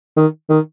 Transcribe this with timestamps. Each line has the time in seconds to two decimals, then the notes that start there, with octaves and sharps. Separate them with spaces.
0.17 D#3
0.49 D#3